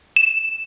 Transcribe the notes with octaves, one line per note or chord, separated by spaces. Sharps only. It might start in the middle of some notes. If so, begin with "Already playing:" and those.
E7